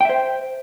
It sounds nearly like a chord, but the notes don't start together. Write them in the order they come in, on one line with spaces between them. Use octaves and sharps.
G5 E5 C5